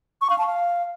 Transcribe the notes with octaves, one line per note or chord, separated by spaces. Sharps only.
C#6
F5
A5
F5